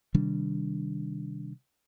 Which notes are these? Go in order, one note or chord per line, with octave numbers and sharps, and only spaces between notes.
C3 D#3 G3 D4